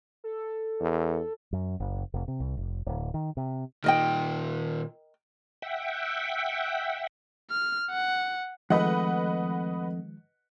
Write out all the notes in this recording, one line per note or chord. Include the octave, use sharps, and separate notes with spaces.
A4
E2
F#2
F#1
F1
C3
C2
F1
D1
D#3
C3
A#2 D#3 A#4 D#5 G5
E5 F#5 G5
F6
F#5
F2 D#3 F3 G#3 A3 B4 D#5 F#5